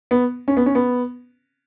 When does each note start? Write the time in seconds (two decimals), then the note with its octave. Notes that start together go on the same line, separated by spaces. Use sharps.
0.11 B3
0.48 C#4
0.57 B3
0.66 C#4
0.75 B3